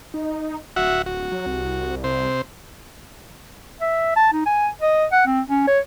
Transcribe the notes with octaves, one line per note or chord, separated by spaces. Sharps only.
D#4
D1 F#4 E5 F#5
F#4
F#3
C2
C3 C5
E5
A5
D#4
G#5
D#5
F#5
C4
C#4
C#5